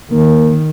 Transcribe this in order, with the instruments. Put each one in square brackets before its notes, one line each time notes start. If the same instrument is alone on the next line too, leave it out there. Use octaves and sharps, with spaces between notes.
[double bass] D#3 [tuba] A#3